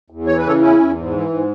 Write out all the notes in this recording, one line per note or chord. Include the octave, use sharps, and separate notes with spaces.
E2
E3 C#5
B4
C#3 A4 C#5
E2 C#4 E4
E2
G#2
E3
G#2